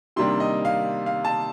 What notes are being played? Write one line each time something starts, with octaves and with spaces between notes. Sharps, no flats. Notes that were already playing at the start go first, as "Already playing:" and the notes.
C3 D#3 G3 A#3 D4 C6
D#5
F5
F5
A5